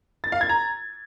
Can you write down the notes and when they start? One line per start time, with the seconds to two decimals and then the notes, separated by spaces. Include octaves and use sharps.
0.24 A6
0.32 F5
0.41 G#6
0.49 A#5